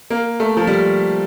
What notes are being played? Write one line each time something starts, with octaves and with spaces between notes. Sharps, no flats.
A#3
A3
F3
G3